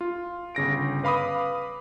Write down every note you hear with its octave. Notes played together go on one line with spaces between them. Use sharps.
F4
G1 C#3 A#6 D7
B4 F5 B5 D6 D#6